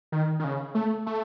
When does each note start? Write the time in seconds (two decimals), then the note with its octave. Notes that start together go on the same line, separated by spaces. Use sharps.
0.12 D#3
0.39 D#3
0.44 C#3
0.75 A3
1.07 A3